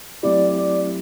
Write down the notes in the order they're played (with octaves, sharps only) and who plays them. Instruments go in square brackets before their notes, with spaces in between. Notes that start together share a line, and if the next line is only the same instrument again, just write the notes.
[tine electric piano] F#3 A3 C4 E4 G4 [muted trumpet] D5
[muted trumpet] D5